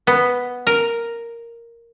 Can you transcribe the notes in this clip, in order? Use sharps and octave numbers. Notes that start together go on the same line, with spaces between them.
B3
A#4